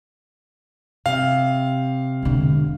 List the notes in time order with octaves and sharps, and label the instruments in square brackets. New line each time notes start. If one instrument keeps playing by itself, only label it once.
[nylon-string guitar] C3 [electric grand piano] F5
[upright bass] E1 D3